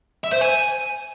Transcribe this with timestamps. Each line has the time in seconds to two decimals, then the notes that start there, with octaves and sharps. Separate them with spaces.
0.24 E5
0.33 C5
0.41 G#5